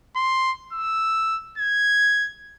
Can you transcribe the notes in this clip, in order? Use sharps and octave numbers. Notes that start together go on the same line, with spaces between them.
C6
E6
G#6